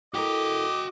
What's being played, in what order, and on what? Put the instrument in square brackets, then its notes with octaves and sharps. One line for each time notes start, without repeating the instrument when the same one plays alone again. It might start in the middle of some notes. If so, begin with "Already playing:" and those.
[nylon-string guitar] E4 A4 A#4 [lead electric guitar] F#4 G5 [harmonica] D#5 D6